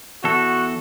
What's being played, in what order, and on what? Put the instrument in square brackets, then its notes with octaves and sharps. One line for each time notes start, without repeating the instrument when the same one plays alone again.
[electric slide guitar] E2 A4 [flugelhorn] F#4